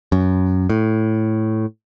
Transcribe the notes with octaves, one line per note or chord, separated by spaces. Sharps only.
F#2
A2